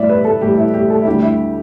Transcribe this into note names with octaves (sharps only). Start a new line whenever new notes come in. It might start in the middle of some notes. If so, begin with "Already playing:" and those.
Already playing: A2 E3 G3 D5 E5
B4
A4
A2 E3 G3 G4
E4
G4
A4
E4
D2 D3 G3 G4
E4